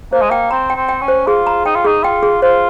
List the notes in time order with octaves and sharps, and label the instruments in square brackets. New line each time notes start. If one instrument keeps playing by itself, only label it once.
[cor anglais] A#3 [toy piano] C5
[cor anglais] G#3
[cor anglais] A#3 [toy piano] G5
[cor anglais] C4 [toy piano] A#5
[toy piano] G5
[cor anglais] C4
[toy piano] G5
[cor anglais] C#4
[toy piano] C5
[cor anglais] F4 [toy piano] G#4
[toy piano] A#5
[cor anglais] D#4 [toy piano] G5
[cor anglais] F4
[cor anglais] D#4 [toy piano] G#4
[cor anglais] F4 [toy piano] G5
[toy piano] G#4
[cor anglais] F4 [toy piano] C5